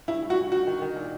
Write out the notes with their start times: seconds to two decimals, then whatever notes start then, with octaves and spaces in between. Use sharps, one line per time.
0.08 G2 E4
0.23 G2
0.30 F#4
0.37 G2
0.52 D#3 F#4
0.67 D#3
0.81 D#3
0.96 A#2